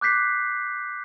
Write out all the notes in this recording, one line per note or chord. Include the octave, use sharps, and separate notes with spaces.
D6 F#6 G6 B6 C7